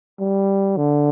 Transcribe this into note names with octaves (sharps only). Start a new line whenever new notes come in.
G3
D3